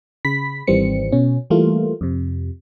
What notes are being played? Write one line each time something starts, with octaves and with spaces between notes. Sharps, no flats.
C#3 B5 B6
G#1 D#3 E3 G3 C4 C#7
B2 C#4
E3 G3 A3 A#3 F4
F2 C3